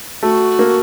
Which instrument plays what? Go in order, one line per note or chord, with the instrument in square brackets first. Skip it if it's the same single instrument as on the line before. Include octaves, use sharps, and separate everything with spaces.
[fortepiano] A3 [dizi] F#4
[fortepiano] A#3